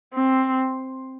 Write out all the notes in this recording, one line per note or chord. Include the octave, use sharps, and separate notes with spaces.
C4